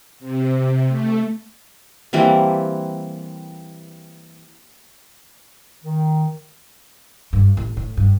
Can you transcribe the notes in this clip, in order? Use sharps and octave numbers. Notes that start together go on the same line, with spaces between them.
C3
A3
E3 G3 A#3 C4
D#3
G2
A1
A2
G2